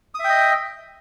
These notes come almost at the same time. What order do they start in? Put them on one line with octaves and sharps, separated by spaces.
D#6 E5 G5 D#5